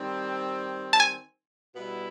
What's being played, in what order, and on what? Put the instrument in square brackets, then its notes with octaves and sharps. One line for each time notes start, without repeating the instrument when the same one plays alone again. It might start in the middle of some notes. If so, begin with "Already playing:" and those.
Already playing: [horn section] D#3 G3 C4
[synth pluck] A5
G#5
[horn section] B2 G3 B3 E4